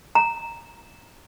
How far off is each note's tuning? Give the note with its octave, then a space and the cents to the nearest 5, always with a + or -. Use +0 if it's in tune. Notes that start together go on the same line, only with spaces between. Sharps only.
A#5 -10